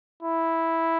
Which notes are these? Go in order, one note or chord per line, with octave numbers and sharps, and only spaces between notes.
E4